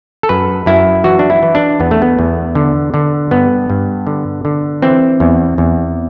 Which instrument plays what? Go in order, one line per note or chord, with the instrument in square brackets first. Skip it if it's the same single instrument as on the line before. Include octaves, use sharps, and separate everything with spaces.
[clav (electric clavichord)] A4
F#2 B4
F#2 E4
E3 F#4
D4
E4
E3
D4
E2 B3
A3
B3
E2
D3
D3
G2 B3
G2
D3
D3
E3 C4
E2
E2